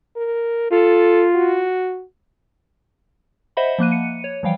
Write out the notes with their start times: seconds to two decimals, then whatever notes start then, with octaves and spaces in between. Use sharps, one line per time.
0.17 A#4
0.72 F4 A4
1.35 F#4
3.57 C5 D#5 E5 F#5 B5
3.78 F3 A#3 F#6 D#7
3.91 C#7 D#7
4.24 C#5
4.43 E3 F3 G3 F5 G5